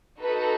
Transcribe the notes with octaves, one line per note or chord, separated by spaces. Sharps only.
D#4 F#4 A4 B4